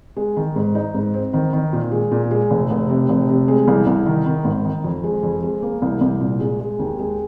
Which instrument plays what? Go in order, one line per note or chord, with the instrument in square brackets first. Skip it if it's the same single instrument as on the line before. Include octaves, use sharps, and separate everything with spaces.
[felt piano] G#3
D#3
G#2
D#4
G#2
C4
D#3
D#3
A#2
G#3
A#2
G#3
F1
F1
C3
F1
C3
G#3
C2
C2
D#3
D#3
G#1
D#3
F2
G#3
F2
G#3
A#3
C2
C2
A#2
G#3
G#3
D#2
G#3